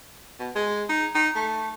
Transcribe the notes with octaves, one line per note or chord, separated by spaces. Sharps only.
B2
G#3
D#4
D#4
A3